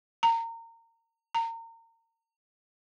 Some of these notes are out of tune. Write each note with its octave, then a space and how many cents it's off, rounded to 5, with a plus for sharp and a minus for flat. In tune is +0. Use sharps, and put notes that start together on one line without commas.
A#5 -25
A#5 -30